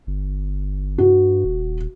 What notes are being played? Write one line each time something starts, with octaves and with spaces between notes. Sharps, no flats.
G1
G2 F#4
D#1